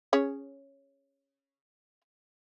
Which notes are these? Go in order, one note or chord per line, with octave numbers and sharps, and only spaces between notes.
C#4 G#4 C#5